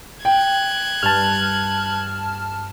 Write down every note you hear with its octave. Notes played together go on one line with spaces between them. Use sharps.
G5 F#6 G#6
G2 A5 F6